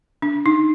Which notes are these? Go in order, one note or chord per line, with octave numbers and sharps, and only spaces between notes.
D4
D#4